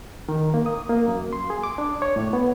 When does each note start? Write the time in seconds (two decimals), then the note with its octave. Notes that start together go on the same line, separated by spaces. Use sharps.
0.29 D#3
0.54 A#3
0.66 D#6
0.89 A#3
1.08 F#2
1.33 C6
1.50 G#4
1.63 D6
1.78 D4
2.02 C#5
2.16 A2
2.33 B3